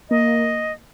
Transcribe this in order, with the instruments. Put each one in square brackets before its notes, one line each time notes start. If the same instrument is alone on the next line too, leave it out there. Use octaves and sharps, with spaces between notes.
[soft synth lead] A#3 [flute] D#5